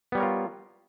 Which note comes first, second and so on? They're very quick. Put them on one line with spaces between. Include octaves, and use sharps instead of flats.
B3 G3 C#5 A#4 F4